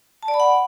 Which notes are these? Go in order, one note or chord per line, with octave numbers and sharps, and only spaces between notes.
A5
D5
B5
F#5